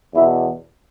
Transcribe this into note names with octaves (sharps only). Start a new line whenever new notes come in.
E2 B2 E4